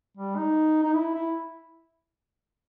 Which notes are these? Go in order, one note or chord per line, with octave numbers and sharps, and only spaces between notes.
G3
D#4
D#4
E4
E4